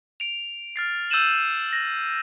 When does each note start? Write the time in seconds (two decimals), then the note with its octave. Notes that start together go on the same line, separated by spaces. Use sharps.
0.20 D7 F7
0.76 F6 A6 C7
1.10 E6 G6 A6 D#7 E7 F#7
1.73 A#6